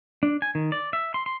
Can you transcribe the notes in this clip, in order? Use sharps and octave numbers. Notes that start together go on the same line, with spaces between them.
D4
G#5
D#3
D5
E5
C6
C6